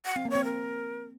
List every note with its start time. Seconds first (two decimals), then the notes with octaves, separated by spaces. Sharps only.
0.05 F#5
0.16 C4 F5
0.25 A#3
0.30 C#5
0.35 C4
0.44 A#4